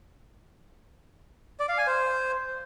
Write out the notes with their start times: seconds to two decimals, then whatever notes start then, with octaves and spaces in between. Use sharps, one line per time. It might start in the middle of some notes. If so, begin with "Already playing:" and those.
1.60 D5
1.69 F5
1.78 G#5
1.87 C5